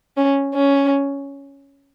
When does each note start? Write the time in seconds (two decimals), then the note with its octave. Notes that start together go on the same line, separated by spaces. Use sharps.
0.17 C#4
0.54 C#4